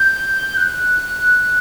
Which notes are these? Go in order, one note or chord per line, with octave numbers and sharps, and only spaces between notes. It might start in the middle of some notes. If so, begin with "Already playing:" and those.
Already playing: G6
F#6